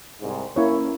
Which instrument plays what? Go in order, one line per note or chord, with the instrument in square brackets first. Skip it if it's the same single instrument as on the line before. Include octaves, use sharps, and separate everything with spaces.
[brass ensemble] C2 G#2
[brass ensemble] A#3 C#4 [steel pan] E4 C#5